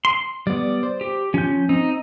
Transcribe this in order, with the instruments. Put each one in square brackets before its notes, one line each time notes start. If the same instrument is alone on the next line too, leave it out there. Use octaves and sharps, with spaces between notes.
[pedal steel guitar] C6
[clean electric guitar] G3 B3 [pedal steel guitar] D5
[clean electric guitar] C5
[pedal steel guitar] G4
[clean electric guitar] F3 [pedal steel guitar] C#4 G6
[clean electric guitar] C4 [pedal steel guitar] D#4